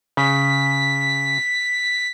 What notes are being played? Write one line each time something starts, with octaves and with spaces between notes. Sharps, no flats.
C#3 B6